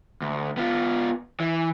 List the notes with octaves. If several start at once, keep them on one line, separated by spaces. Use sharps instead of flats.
D2
B3 F4
E3